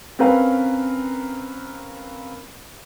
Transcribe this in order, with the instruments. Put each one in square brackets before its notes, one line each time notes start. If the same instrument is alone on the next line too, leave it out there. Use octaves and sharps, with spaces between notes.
[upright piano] C4 C#4 A#4 B4 F5